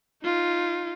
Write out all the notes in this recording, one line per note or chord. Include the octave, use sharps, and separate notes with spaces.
D#4 F4